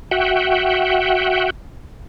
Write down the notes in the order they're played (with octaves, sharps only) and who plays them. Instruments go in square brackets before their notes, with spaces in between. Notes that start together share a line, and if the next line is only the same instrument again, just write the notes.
[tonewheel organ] F#4 E5 F#5 G5